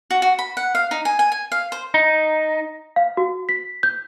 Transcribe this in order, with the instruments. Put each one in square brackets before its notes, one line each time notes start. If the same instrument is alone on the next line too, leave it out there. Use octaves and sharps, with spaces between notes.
[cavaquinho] F#4
F#4
B5
F#5
F5
D#4
G#5
G#5
G#5
F5
C5
[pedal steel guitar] D#4
[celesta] F5
F#4
B6
G6